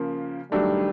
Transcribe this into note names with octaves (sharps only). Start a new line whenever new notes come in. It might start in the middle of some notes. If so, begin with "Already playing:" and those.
Already playing: C#3 F3 A#3
D#3 F#3 G3 A3 D4